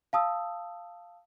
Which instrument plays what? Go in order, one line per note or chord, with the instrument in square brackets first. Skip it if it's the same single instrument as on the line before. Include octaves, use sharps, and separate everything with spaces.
[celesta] F5 A5 D#6 E6